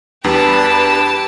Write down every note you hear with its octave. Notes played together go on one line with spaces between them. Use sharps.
E2 G3 D4 G4 B4 A5